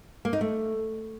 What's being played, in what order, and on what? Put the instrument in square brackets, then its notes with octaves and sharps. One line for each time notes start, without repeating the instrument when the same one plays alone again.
[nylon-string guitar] A#3
D#4
A3